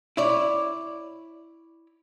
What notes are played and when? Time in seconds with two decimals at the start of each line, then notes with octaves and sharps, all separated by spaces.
0.17 E4 C#5 D5